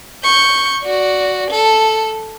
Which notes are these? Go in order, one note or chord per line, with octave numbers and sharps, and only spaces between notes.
C#6 G6
F#4 D5
A4